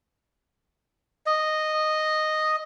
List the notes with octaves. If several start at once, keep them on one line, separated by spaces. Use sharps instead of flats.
D#5